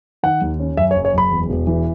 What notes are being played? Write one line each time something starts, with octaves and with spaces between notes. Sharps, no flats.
D#3 F#5
D#2
C#4
F#2 E5
C#5
F#1
C#5
F#1 B5
E2
E1
E3